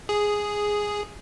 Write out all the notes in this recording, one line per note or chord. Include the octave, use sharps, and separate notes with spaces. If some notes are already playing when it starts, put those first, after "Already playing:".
G#4